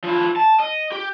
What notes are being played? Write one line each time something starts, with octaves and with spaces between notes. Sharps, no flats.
F3 E4
A5
D#5
G4